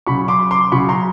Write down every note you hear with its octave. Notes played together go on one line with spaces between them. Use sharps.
C#3 F#3 B5 C#6
C6 D6
C6 D6
C#3 F#3 B5 C#6
A#5 C6